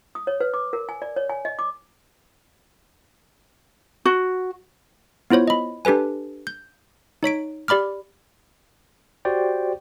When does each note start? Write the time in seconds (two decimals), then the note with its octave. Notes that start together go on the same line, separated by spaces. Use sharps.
0.15 D#6
0.27 C#5
0.40 B4
0.54 D6
0.73 A#4
0.89 G#5
1.02 D5
1.16 C#5
1.29 G#5
1.45 D#5
1.59 D6
4.05 F#4
5.30 B3 E4 F4 C5 C#5
5.48 D#5 B5
5.85 D4 G4 A4 B4 G#5
6.47 G6
7.23 D#4 C#5 B6 D7
7.68 G4 D5 B5 D6 F6
9.25 F#4 G4 C5 D5 G5